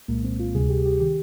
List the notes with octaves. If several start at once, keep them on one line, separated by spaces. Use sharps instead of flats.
C2 A#2 G#3 A#3
C4
F4
D2 C3 G3 G#4
G4
G4
D#3 G4